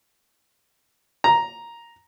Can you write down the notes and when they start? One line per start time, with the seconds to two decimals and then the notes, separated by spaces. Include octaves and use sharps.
1.24 A#5